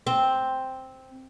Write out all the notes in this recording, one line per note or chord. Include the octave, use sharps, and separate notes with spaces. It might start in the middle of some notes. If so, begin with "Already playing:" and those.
C4